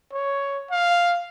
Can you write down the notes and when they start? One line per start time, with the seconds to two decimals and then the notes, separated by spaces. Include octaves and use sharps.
0.13 C#5
0.70 F5